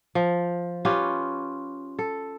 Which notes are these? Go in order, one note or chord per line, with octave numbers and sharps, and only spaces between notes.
F3
C#4 F4 G4 B4
A4